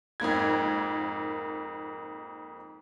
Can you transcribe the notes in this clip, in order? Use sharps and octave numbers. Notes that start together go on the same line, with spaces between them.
F2 G#2 A#3 G#6